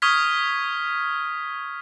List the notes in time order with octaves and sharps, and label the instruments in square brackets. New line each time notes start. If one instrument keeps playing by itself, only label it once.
[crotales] C#6 D#6 F6 G#6 B6